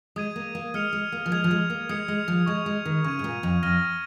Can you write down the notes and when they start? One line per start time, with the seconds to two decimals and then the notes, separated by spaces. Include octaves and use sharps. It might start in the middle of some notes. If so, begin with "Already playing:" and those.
0.16 G#3 D#6 G#6 D#7
0.36 A#3
0.55 A#3
0.74 G#3 F6 C#7 F7
0.93 G#3
1.12 A#3
1.26 F3
1.32 G#3 G#6 F7
1.44 F3
1.51 G#3
1.70 A#3
1.89 G#3 D#6 G#6 C#7
2.08 G#3
2.28 F3
2.46 G#3 C#6 G#6 F7
2.66 G#3
2.85 D#3
3.04 C#3 C#6 G#6 D#7
3.19 G#2
3.24 A#2
3.43 F2
3.63 F2 F6 A#6 D#7